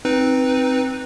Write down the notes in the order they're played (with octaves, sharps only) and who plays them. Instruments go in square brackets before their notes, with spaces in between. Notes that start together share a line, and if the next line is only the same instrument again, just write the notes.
[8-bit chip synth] C4 D#4 B4